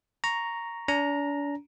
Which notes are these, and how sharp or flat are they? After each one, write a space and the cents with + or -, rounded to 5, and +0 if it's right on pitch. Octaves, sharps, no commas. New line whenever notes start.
A#5 +0 C#6 +0
D4 -40 A#5 +0